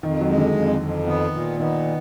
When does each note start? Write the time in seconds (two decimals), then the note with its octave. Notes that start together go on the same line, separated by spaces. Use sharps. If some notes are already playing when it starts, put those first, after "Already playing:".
0.03 F2 D#3
0.21 F#3
0.29 G#3
0.38 D3
0.56 F2
0.81 F2
1.07 D#3 B3
1.34 A#2
1.60 D#3 B3